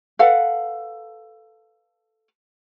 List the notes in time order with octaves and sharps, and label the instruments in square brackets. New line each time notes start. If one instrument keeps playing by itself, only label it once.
[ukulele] A4 B4 F5 F#5